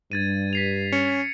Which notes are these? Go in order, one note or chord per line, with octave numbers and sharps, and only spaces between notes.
G2 G#6 A6 D#7
B6 C7 F7
C#4 C#7